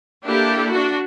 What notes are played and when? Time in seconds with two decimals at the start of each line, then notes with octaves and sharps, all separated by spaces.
0.23 A#3 D4 E4 G4 A4
0.70 D4 F#4